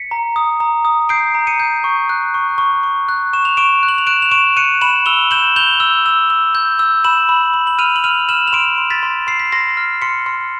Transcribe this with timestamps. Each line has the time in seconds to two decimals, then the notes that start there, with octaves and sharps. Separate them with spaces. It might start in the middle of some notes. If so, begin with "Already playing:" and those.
Already playing: B6 C#7
0.11 A#5
0.36 D#6
0.60 A#5
0.85 D#6
1.09 G6 C7 D7
1.35 A#5
1.47 C#7 D#7
1.60 G6
1.84 C#6
2.09 F#6
2.34 C#6
2.58 C#6
2.83 C#6
3.09 F#6
3.33 C#6 E7
3.45 F7
3.57 C#6 D7 E7
3.83 F#6
3.88 F#7
3.98 F7
4.07 F#6 D7 E7
4.22 F7
4.31 C#6 D7 E7
4.57 F#6 C#7 D#7
4.81 B5 E7 F#7
5.06 E6 F7 G7
5.31 G6 E7 F#7
5.56 G6 F7 G7
5.80 E6
6.06 E6
6.30 E6
6.55 G6
6.79 E6
7.04 B5 E7 F#7
7.29 B5
7.54 B5
7.67 F#7
7.78 F6 D#7 F7
7.96 F#7
8.04 F6 D#7 F7
8.29 F6 E7 F#7
8.48 F7
8.53 C6 D7 E7
8.78 C6
8.90 A6 B6
9.03 C6
9.27 C6 C7
9.40 B6
9.52 C6 A#6 C7
9.77 F6
10.01 C6 B6 C#7
10.26 C6